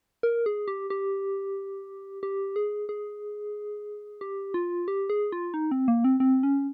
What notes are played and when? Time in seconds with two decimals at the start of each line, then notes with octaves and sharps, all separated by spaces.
0.23 A#4
0.46 G#4
0.68 G4
0.90 G4
2.23 G4
2.56 G#4
2.89 G#4
4.21 G4
4.54 F4
4.88 G4
5.10 G#4
5.32 F4
5.54 D#4
5.71 C4
5.88 A#3
6.04 C4
6.20 C4
6.43 C#4